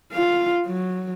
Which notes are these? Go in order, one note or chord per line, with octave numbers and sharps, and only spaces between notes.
F4 F5
F#3